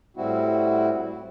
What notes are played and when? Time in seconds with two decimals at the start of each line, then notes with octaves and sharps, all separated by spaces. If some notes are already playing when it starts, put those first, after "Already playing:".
0.17 A2 G3 C4 E4 F#4